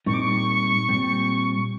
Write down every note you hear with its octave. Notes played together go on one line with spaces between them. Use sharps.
A#2 G3 C4 D#4 C#6
D6
C#6
A#2 G3 C4